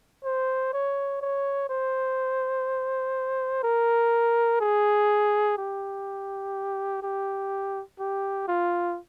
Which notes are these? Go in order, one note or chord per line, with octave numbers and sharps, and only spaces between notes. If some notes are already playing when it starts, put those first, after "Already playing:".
C5
C#5
C#5
C5
A#4
G#4
G4
G4
G4
F4